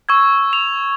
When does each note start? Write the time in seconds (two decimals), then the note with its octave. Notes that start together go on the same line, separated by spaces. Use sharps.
0.09 C#6 E6 G#6
0.53 F7